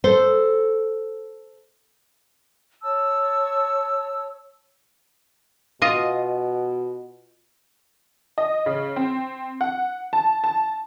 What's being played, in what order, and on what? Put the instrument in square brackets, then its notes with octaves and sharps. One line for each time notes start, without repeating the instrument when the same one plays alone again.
[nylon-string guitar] A4 C5
[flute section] C#5 A5 E6
[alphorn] B2 [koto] F4 D#5
[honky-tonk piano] D#5
C#3
C4
F#5
A5
A5